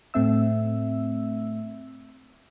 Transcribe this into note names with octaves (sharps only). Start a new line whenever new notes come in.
A2 A3 C4 E5 E6